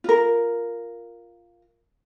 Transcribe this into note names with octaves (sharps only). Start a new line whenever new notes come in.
F4 A#4